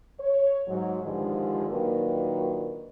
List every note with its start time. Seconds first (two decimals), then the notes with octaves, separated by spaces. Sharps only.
0.19 C#5
0.67 G#2 F#3
1.02 G2 D3 D#3 F3 G3 G#3
1.69 A#2 D#3 F#3 A#3 D4 B4